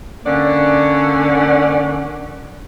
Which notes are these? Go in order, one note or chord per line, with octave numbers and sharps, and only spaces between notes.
D3 A#3 C#4 D5 F#5